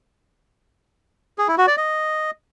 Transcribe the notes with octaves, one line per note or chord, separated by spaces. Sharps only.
G#4
E4
F#4
D5
D#5